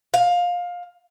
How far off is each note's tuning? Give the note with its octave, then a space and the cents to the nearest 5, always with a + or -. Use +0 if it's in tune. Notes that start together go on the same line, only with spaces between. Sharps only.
F5 +20